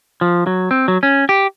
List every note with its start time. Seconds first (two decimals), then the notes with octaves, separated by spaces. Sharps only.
0.21 F3
0.47 F#3
0.71 C4
0.88 F#3
1.03 C#4
1.29 G4